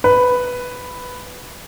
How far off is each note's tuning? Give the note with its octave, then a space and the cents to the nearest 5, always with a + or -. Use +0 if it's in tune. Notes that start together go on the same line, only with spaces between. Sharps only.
B4 +5